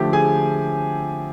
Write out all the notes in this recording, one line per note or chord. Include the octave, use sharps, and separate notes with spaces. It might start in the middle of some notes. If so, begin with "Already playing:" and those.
Already playing: D3 F3 A3 G4 G5
G#4 G#5